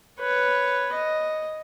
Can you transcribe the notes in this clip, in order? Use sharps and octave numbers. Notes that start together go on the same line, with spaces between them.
B4 C#5
D#5